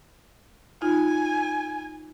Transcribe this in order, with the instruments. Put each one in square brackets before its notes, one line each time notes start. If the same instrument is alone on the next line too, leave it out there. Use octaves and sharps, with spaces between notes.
[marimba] D#4 F4 [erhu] G#5